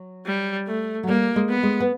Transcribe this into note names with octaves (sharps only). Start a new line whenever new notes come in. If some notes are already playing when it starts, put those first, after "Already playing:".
Already playing: F#3
G3
A3
F#3
G3 A#3
G#3
B3
G#3
B3